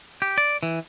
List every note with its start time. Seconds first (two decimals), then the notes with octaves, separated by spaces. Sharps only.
0.22 G4
0.38 D5
0.63 E3